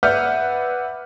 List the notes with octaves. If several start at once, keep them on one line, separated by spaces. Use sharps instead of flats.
B4 D5 E5 F#5 F6 G6